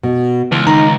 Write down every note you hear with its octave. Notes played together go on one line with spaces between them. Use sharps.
B2
C#2 E3 A5
D#3 D#4 A#5